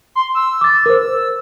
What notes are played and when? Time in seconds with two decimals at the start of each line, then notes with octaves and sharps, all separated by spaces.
0.15 C6
0.35 E6
0.61 D6 A6
0.86 A#4 C5